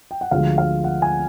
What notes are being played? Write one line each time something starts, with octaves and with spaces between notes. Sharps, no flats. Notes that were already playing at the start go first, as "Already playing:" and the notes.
G5
F#5
D2 D3 F3 G#3 F5
F5
F#5
G#5